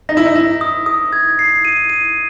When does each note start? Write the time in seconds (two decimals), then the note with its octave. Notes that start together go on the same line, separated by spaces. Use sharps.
0.09 D#4 A#6
0.17 E4
0.26 D#4
0.35 E4 A#6
0.61 D#6
0.86 D#6
1.13 G#6
1.39 C7
1.65 D#7
1.90 D#7